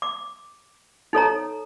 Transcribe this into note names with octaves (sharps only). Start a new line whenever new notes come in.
D6
D#4 A4 C#5 A#5